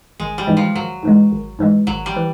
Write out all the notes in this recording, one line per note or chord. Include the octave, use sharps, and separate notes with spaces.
G#1 G#3
G3
G#2 E3 G#3
F3
G#1 F#3
G#2 E3 G#3
G#1
G#2 E3 G#3
G#1 F#3
G3
E3